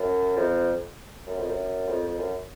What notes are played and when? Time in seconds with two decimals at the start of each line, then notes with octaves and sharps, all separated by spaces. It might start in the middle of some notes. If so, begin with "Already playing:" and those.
Already playing: F#2
0.36 F2
1.27 F#2
1.38 F2
1.47 F#2
1.88 F2
2.03 F2
2.18 F#2